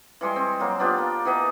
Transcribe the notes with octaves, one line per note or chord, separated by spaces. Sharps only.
E3 G3 G#3 C6
C4
F#3 A#3
B3 D4 F4 G4
A#3
E3 B3 D#5 A#5